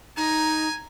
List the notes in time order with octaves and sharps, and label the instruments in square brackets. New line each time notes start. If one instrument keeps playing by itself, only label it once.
[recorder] D#4 [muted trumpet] G#5 [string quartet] A#5